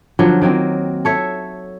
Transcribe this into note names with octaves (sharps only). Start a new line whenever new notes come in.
D3 F3 F#3
D#3 F#3 A#3 C4
A4 C#5 E5